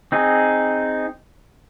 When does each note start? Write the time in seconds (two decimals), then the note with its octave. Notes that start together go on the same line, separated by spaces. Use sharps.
0.12 C4 D#4 G#4